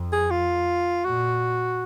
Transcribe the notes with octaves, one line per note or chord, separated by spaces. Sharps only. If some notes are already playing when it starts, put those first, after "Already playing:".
Already playing: F2
G#4
F4
A#2 F#4